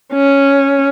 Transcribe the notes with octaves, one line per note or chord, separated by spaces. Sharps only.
C#4